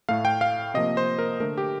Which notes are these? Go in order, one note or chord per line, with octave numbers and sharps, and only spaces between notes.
A2 A3 F5
G5
F5
C3 F3 A#3 D#5
C5
A#4
D3 A3 A#4
G4